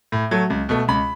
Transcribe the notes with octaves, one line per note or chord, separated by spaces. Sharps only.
A2
F#3 A3
C#2
B2 A3
C#2 B5